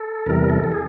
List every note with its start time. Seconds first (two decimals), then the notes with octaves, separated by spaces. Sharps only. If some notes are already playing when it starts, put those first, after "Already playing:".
Already playing: A4
0.26 E2 C3 E3 G3 A#4
0.49 A4
0.64 A4
0.72 G#4